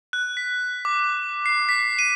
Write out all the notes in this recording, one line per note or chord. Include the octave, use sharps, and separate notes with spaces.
F#6
B6
D6
C7
B6
D#7